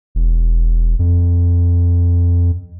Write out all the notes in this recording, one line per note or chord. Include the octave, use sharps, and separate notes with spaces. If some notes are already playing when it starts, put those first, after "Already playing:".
E1
F2